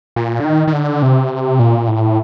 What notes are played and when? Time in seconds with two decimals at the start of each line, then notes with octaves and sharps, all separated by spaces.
0.16 A#2
0.40 D3
0.45 D#3
0.67 D#3
0.73 D3
1.02 C3
1.59 A#2
1.88 A2